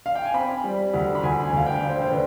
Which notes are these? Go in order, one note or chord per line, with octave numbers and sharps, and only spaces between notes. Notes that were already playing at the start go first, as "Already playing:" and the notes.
F5
G5
G#5
C4 B5
G3
D2
B5
D2 G#5
G#5
D2 F5
G5
D3
C5
C5
D3 B4